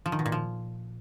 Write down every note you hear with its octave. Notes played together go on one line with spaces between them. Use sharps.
F3
D#3
B2
A#2
F3